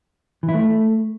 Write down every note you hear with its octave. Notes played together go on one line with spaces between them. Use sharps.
E3
E4
A3